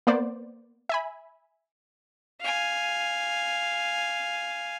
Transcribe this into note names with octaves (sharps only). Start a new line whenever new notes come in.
A#3 B3 C5 D5
E5 G#5 B5
F5 G#5